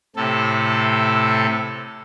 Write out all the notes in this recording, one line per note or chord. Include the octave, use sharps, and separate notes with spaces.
A2 C3 A4